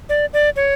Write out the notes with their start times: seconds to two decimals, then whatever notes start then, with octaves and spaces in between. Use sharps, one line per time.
0.09 D5
0.33 D5
0.56 C#5